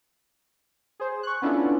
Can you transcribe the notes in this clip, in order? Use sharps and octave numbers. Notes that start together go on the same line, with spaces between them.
G#4 C5
C#6 F#6
B3 C#4 D4 E4 F4 A4